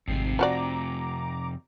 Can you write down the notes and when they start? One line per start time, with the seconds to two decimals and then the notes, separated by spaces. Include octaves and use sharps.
0.08 G#1 F2 C3 C7
0.39 F3 F#4 D5 A#5 D6